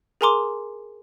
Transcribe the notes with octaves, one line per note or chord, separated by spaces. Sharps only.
G#4 A#4 G#5 A#5 C6 D6